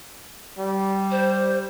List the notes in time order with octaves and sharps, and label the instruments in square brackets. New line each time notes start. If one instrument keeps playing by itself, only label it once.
[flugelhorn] G3
[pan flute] C5